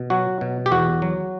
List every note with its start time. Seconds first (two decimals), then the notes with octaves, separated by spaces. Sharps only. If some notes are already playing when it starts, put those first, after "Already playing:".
Already playing: B2
0.10 F#3 F#4
0.41 B2
0.66 G4
0.71 E2 F#4
1.02 F#3